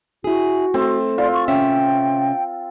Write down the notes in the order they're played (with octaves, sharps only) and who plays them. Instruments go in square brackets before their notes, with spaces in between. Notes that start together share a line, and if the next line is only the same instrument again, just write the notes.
[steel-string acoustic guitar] E4 G#4 [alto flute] F#4
[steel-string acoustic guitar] A3 [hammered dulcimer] C4
[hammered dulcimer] F4 [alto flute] D5
[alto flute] C#6
[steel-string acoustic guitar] C3 C#4 E5 [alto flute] G5